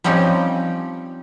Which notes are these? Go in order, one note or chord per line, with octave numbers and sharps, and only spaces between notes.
F3 G3 C4 C#4 D#4 G4